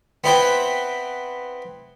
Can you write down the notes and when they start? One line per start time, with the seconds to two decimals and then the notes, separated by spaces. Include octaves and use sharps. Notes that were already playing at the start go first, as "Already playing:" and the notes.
0.24 B3 C4 E4 B4 G5